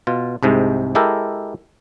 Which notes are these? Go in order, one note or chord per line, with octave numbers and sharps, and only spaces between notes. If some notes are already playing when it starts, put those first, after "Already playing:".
B2 F4
C2 G#2 C3 G#3
G#3 E4 G4 A4 A#4